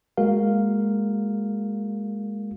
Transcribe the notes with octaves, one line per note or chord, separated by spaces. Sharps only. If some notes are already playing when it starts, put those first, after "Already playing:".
G#3 A#3 F#4 A#4 F5